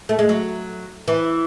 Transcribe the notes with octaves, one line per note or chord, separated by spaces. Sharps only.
A3
G#3
F#3
E3